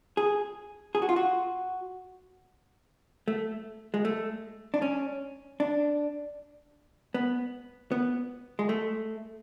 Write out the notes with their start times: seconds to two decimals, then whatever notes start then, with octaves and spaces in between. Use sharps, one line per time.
0.17 G#4
0.95 G#4
1.02 F#4
1.09 F4
1.16 F#4
3.28 A3
3.94 G#3
4.05 A3
4.74 D4
4.82 C#4
5.60 D4
7.14 B3
7.92 B3
8.59 G#3
8.69 A3